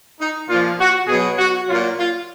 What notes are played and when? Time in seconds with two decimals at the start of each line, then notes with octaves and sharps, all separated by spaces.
0.19 D#4
0.48 A#2 F3 F4
0.79 F#4
1.08 B2 F#3 G#4
1.38 F#4
1.67 A#2 F#3 F4
1.97 F4